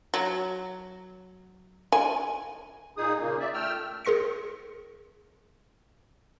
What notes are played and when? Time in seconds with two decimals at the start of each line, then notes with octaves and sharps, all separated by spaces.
0.14 F#3
1.92 G#5
2.97 A#2 D#4 G#4 D#6
3.19 A#2 C#3 A#3
3.40 D5 E5
3.54 A3 G5 E6 F6
4.05 G#4 A#4 C6 A#6 C#7